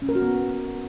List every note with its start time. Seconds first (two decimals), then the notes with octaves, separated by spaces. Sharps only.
0.02 C#4
0.09 A#4
0.15 F#4
0.22 B3